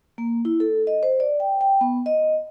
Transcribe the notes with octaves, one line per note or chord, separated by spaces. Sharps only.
A#3
E4
A4
D#5
C5
D5
G5
G5
B3
D#5